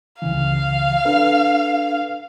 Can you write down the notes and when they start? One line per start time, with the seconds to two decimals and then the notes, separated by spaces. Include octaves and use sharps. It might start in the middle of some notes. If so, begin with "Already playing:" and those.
0.22 C#2 C#3 E3 F5
1.05 D4 A4 B4